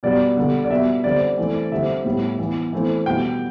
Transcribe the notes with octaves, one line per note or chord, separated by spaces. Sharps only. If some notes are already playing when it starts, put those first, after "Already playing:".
B2 G3 B3 D5
D3 G3 B3
D5
B2 G3 B3 E5
D3 G3 C4 D5
E3 A3 C4
D3 G3 C4 E5
A2 G3 B3
E3 B3
E3 A3 C4
B2 G3 B3 G5